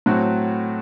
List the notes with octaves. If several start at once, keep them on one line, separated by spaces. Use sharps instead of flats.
A2 F#3 C4 F#4